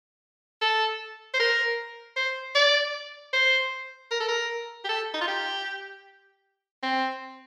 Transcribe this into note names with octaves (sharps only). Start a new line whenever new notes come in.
A4
C5
A#4
C5
D5
C5
A#4
A4
A#4
G4
A4
D#4
F4
G4
C4